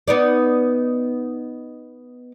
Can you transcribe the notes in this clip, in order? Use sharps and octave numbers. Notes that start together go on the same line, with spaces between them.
B3 D#4 D5